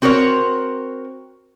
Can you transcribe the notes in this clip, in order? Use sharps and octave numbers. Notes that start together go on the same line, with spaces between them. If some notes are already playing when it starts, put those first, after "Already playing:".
C4 F#4 A#4 C5 C#5